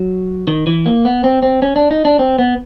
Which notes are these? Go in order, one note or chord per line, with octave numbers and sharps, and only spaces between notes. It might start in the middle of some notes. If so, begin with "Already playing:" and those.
Already playing: F#3
D#3
E3
A#3
B3
C4
C4
C#4
D4
D#4
D4
C4
B3